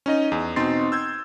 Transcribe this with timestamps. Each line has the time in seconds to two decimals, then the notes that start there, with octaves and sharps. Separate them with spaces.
0.06 C#4 D#4 D#5
0.32 E2
0.56 B2 C4 D#4 C6 A6 C7
0.92 E6 G6 G#6